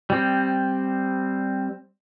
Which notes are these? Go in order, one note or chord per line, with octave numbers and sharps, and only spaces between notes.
G3 C4